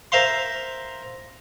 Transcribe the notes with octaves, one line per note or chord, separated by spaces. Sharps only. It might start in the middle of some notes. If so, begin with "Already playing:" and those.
A#4 C5 E5 F5 C6